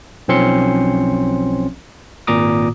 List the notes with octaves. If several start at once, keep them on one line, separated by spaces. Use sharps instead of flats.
B1 F3 C4 C#4 C6 C#7
G#1 A#2 A#5 D6 D#6